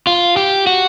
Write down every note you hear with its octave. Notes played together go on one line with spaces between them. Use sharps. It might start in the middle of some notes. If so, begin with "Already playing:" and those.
F4
G4
F#4